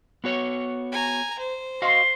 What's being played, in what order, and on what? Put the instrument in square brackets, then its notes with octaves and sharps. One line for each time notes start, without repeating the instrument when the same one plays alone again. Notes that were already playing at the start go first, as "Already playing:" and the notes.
[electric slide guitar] B3 F#4 C#5
[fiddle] G#5 A#5
C5
[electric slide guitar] F#4 D#5 F5 [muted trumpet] C6